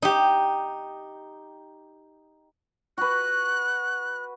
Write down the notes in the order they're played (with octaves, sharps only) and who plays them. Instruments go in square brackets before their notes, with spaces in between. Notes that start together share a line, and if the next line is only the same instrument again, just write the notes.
[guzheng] D#4 G4
[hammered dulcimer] F#4 B4 [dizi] F#6